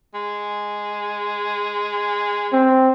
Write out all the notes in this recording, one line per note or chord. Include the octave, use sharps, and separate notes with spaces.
G#3
C4